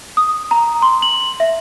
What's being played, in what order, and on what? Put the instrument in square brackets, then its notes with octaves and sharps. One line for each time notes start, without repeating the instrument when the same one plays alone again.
[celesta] D#6
A#5
C6
F#7
E5